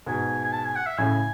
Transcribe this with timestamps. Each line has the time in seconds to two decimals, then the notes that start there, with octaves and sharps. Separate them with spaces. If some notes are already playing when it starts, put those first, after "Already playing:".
0.06 G#2 B2 G#5
0.44 G#5
0.53 A5
0.64 G#5
0.76 F#5
0.87 E5
0.98 A2 C#3 G#5